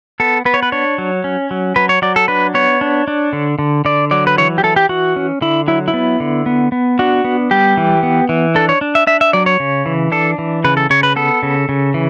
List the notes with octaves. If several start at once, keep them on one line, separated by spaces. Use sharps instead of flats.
B3 A4
B3 B4
C#5
B4
D4 C#5
F#3
C#4
F#3
F#3 B4
C#5
F#3 D5
A4
D4 B4
B3 C#5
D4
D4
D3
D3
D3 D5
F#3 D5
B4
E3 C#5
G4
E3 A4
G4
E3 F#4
C#4
D3 E4
F#3 E4
E4
B3
D3
B3
B3
D4 F#4
B3
G3 G4
E3
B3
E3
D4 A4
C#5
D4
E5
D4 E5
E5
F#3 D5
C#5
C#3
E3
D4 A4
E3
C#3 B4
A4
C#3 C#5
B4
B3 A4
C#3
C#3
E3